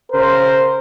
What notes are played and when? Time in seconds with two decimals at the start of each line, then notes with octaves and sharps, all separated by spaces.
0.13 C#3 A#4 C5